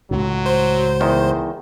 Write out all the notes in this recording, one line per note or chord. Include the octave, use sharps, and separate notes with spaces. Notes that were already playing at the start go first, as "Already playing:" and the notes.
C#2 A2 F#3
C5
E2 D#3